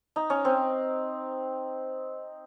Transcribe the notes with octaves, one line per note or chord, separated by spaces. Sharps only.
D#4
C#4
C4